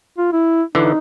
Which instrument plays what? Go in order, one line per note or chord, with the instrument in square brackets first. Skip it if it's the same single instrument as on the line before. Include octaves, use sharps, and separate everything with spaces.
[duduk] F4
E4
[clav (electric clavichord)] D3 E3 [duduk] D#4